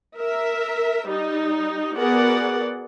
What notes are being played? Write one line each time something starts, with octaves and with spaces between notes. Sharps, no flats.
A#4 E5
G3 D#4
B3 F#4 G#4 A#4 D5 F#5